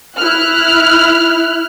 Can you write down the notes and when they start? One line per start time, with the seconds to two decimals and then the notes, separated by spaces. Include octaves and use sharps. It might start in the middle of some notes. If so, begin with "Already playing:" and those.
0.16 E4 F6 F#6